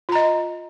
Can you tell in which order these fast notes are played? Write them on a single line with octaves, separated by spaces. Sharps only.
F4 A#5 D#5